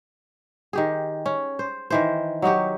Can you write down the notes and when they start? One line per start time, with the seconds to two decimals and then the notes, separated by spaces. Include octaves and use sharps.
0.73 D#3 G4 G#4
1.26 C#4
1.59 C5
1.90 D#3 E3 C5
2.42 F#3 D#4 F#4 G4